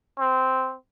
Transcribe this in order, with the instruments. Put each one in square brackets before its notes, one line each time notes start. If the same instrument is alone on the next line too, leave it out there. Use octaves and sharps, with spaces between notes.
[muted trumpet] C4